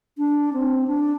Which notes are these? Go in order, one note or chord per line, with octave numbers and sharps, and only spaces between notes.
D4
C4
D4